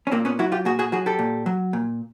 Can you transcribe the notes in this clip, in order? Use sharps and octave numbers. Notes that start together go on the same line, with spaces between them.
C#4
A#2 A#3 C4
B3 C#4
F#3 E4 F#4
F4 G4
A#2 F#4 G#4
F#4 G#4
F#3 F#4 G#4
G4 A4
A#2
F#3
A#2